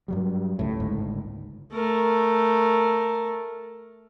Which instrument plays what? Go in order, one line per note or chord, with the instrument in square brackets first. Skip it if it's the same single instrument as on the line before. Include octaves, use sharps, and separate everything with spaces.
[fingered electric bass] G2 F#3 G3
[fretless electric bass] C#2 A2
[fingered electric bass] G1 G#2
[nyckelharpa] A3 A#4